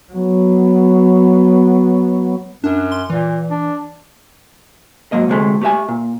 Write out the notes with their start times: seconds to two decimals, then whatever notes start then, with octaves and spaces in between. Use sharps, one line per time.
0.12 F#3 B3
2.64 F#2 D4
2.92 C6
3.10 A#2 E3
3.50 D4
5.12 G#2 F#3 A#3 D#5
5.28 D2 C3 G#3 A3
5.61 A3 G4 B4 E5 G#5
5.89 A#2